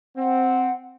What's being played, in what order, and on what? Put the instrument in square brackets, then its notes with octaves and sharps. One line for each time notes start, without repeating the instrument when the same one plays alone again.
[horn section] C4 [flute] F#5